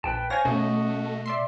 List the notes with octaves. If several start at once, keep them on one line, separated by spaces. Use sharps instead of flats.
A#1 B4 G5 A5
C5 C#5 F5 G#5 A#6
B2 A3 C#4 F#4 D#5 C#6
D5 E5 C6